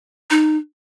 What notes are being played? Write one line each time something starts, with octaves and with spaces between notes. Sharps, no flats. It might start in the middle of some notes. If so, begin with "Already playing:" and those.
D#4